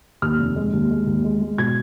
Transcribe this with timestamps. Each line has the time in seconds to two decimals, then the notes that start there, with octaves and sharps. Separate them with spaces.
0.22 D#2 F6
0.39 F1
0.56 G#3
0.73 D#2
0.90 G#3
1.07 D#2
1.24 G#3
1.41 G#3
1.58 B2 G#6